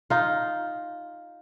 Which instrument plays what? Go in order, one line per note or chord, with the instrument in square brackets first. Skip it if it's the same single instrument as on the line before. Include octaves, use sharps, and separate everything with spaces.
[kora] D#4 F4